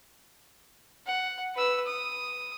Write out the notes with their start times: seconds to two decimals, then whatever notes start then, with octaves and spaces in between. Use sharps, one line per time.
1.06 F#5
1.54 B4 E6
1.86 D#6